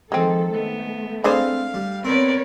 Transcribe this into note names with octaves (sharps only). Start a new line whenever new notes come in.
D#3 F3 G#3 C4 A4
A3 B3
C4 D4 G#4 A4 B4 C5 F5
G3
B3 C4 A#4 B4 C#5 D5